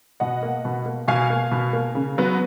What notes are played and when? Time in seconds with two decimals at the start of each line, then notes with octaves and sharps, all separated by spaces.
0.20 B2 D#5 F#5
0.43 A#3
0.65 B2
0.86 A#3
1.08 B2 F5 G#5
1.30 A#3
1.51 B2
1.73 A#3
1.95 C#3
2.18 F#3 B3